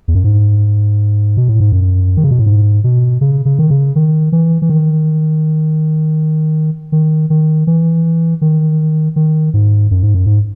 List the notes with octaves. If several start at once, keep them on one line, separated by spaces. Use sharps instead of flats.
E2
F#2
G#2
B2
A2
G#2
F#2
D#3
C#3
B2
A2
G#2
B2
C#3
C#3
D#3
C#3
D#3
E3
E3
D#3
D#3
D#3
E3
D#3
D#3
G#2
F#2
G#2
F#2
G#2